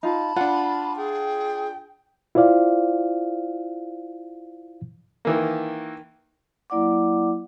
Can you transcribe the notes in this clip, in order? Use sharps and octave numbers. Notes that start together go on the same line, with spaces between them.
D#4 F4 A5 B5
D4 F4 F#5
G#4 G5
E4 F4 C5 D5 F5
D#3 E3 A#3
F#3 A#3 E4 D5 F#5 D6